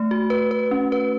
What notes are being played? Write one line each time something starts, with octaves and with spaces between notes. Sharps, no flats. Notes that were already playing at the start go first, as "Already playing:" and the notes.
Already playing: A3
F#4
B4
B4
C#4
B4